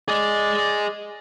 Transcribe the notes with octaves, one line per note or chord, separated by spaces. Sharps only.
G#4 D5 D#5